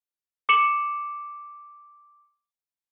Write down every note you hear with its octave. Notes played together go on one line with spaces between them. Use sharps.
D6 C#7 E7 F#7